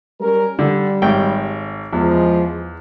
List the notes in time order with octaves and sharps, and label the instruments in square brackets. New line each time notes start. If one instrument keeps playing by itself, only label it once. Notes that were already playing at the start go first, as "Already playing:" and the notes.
[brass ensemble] G3 C#4 A#4
[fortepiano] D3 [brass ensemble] G3
[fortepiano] G#1 C#5 G5
[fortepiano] E2 [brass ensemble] F3 G#3